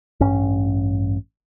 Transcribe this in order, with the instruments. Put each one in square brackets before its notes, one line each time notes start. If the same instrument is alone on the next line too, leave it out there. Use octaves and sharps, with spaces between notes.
[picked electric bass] A1 G2 C#4